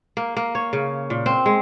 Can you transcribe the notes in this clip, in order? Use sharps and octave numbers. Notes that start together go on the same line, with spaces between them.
A#3
A#3
C#5
C#3
A#2
C4
G#3